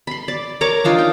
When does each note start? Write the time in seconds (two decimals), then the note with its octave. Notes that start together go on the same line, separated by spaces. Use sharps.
0.07 B5 C6
0.28 D5
0.61 A#4 C#5 A#5 D6
0.84 D4 D#4 F4 A#4
0.98 G5